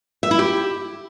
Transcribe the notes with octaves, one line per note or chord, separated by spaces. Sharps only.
E5
E4
G4